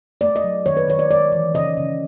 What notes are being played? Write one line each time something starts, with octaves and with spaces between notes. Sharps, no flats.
A3 D5
D#5
F#3
D#3 C#5
B4
D#3 C#5
D5
G#3 D5
E3
C#3 D#5
C#3